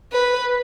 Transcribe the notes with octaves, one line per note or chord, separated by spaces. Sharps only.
B4